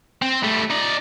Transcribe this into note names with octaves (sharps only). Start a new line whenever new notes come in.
C4
G3 A3
D#4 D5